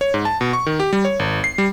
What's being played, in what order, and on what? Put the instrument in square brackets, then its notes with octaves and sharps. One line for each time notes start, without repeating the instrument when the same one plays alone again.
[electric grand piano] C#5
G#2
A5
B2
C#6
D#3
G4
G3
C#5
G#1
C7
G3